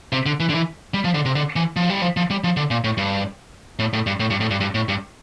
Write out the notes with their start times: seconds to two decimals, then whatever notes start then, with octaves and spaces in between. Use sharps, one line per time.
0.12 C3
0.26 D3
0.40 E3
0.50 D3
0.54 E3
0.94 G3
1.04 F3
1.14 D3
1.25 C3
1.35 D3
1.56 E3
1.76 F3
1.90 G3
2.02 F3
2.17 F3
2.30 G3
2.44 F3
2.57 D3
2.71 A#2
2.84 A2
2.98 G2
3.79 A2
3.93 A2
4.07 G2
4.20 A2
4.30 G2
4.40 A2
4.51 G2
4.61 G2
4.75 A2
4.89 G2